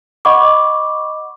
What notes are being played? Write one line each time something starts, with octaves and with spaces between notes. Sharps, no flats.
D#5 F#5 B5 C#6 D6